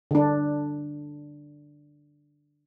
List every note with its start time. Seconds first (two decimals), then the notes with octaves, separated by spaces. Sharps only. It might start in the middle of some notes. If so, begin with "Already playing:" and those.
0.11 D3 D4